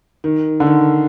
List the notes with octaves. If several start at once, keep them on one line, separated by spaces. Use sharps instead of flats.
D#3
D3
D#3